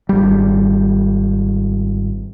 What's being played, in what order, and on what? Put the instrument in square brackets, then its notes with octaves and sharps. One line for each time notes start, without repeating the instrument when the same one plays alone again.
[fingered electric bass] G#1 G3